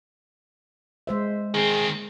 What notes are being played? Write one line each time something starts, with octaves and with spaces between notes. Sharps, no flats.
G#3 C5 E5
D#3 C4 G#4